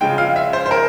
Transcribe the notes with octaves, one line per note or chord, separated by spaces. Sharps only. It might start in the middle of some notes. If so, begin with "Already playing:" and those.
C#3 F3 G#3 G5
F5
E5
C5
C5
A#4